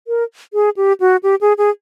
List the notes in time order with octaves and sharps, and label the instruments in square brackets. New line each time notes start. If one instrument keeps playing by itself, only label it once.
[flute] A#4
G#4
G4
F#4
G4
G#4
G#4